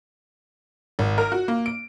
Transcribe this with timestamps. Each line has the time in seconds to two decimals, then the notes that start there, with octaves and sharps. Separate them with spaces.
0.99 G#1
1.18 A#4
1.32 F#4
1.48 A#3
1.66 D7